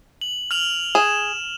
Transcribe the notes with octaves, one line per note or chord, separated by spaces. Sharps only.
F#7
F6 F7 F#7
G#4 E7